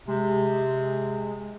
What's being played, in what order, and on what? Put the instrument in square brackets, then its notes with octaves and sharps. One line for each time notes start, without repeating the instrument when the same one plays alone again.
[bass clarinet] C3 [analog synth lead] G#3